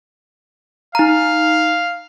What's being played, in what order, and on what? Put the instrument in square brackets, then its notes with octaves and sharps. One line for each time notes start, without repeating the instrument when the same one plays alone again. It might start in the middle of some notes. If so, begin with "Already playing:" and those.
[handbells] D#4 A#5 [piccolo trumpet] F5